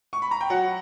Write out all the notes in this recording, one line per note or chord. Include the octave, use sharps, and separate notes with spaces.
C#6
B5
A#5
G5
F#3 F#5